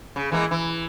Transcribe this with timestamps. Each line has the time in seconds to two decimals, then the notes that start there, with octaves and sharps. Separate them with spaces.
0.16 C#3
0.32 E3 G#3 A#3
0.51 E3